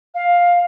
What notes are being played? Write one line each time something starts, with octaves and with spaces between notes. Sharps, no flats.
F5